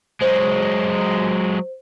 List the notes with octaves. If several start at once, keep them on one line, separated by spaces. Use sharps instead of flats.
F#3 G#3 C5